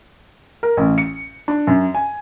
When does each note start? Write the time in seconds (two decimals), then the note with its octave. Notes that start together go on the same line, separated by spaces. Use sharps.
0.63 A#4
0.77 A1
0.98 C#7
1.48 D4
1.67 F#2
1.94 G#5